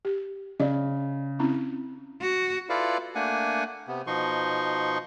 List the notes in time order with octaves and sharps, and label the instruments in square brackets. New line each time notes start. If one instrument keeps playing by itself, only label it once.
[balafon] G4
[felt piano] C#3 [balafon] D5 D#5
[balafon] C4 C#4 E4
[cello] F#4
[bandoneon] E4 F4 A4 B4 D5 F5
A3 A#3 D4 F#5 G#5
C3 B3
B2 F3 D#4 C6 C#6